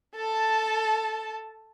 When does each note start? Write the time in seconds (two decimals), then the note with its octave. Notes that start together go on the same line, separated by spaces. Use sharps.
0.16 A4 A5